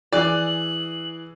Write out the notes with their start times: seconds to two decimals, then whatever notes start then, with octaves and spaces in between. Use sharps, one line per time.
0.12 E3 G#4 D5 F#6 F#7